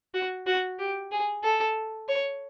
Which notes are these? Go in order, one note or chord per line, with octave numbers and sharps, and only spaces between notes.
F#4
F#4
G4
G#4
A4
C#5